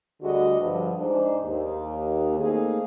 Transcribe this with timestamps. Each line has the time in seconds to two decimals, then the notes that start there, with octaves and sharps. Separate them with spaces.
0.22 D2 D3 G3 F#4 G#4 D#5
0.60 G2 D3 F3
1.00 G#2 D4 D#4 C5
1.44 D#2
2.39 A3 A#3 C4 D#4 G#4